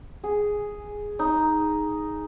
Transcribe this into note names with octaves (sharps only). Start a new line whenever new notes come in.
G#4
D#4